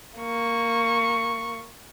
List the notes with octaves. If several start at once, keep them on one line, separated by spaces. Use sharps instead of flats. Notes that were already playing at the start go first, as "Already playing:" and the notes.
A#3 C#6